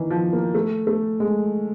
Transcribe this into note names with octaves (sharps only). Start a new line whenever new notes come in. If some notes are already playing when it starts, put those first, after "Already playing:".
Already playing: D#3 E3
F3
A#3
A3
A3
G#3